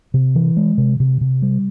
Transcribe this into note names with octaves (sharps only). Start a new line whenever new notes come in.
C3
E3
G#3
C3
C3
C3
G3